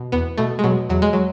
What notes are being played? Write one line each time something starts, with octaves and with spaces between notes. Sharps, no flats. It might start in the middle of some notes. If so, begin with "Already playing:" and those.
Already playing: B2
E2 B3
B2 A3
G#3
B2 F#3
E2 F#3
G#3
F#3